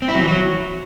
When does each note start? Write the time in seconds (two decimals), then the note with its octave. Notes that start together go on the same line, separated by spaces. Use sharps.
0.02 C4
0.08 E4
0.15 F#3
0.21 E3
0.28 F#3